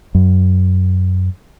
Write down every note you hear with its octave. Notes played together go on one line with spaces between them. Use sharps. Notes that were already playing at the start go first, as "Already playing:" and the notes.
F#2